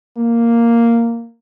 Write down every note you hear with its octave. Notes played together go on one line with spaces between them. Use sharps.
A#3